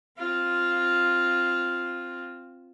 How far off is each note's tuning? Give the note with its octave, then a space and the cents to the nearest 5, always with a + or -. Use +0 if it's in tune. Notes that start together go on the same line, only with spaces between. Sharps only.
C4 +0 F4 +0